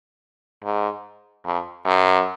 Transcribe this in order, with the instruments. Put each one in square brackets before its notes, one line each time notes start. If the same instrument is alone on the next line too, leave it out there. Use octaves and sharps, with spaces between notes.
[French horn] G#2
F2
F#2